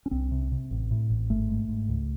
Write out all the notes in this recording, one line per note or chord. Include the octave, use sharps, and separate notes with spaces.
C#4
C2 C4
C3
C3
A1
A2
A1
G#1 A3
G#2
G#2
C#2